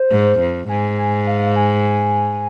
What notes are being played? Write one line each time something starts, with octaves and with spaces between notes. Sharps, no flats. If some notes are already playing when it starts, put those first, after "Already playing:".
Already playing: C5
G#2
F2
G#2 G#5
G#5
F5
G#5